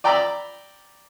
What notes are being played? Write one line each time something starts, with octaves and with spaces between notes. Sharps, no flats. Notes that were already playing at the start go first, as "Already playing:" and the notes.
D5 G5 A#5 B5 D6 E6